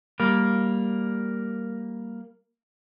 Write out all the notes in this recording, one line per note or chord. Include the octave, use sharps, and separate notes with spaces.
G3 A#3